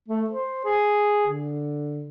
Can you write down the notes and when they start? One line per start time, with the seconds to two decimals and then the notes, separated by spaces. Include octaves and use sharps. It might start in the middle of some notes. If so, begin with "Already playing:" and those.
0.08 A3
0.30 C5
0.65 G#4
1.27 D3